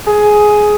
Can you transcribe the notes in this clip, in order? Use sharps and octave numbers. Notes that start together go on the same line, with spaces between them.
G#4